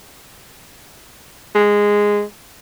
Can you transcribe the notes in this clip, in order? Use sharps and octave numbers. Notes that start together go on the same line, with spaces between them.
G#3